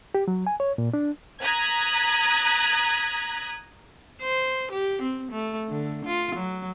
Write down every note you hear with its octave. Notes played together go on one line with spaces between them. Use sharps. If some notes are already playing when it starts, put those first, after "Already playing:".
G4
F#3
G#5
C#5
A#2
D4
A#5 D#6 F#6 G#6 B6
C5
G4
C4
A3
D3
F4
F#3